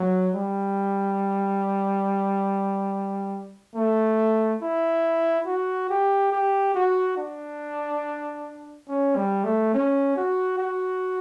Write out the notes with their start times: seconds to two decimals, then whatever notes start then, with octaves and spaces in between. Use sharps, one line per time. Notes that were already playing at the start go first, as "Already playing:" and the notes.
Already playing: F#3
0.35 G3
3.76 A3
4.62 E4
5.46 F#4
5.90 G4
6.32 G4
6.75 F#4
7.17 D4
8.89 C#4
9.16 G3
9.44 A3
9.74 C#4
10.17 F#4
10.58 F#4